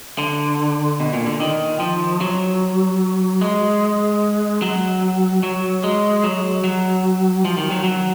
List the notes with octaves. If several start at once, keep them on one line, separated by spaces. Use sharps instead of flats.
D3
B2
A#2
D3
D#3
F3
F#3
G#3
F#3
F#3
G#3
F#3
F#3
F3
D#3
F#3
F#3